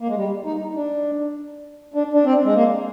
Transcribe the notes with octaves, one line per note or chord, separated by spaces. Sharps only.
A#3
G#3
G3
D#4
D#4
D4
D4
D4
C4
G#3
A#3